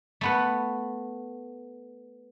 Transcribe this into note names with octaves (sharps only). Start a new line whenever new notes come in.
A3 B3 B4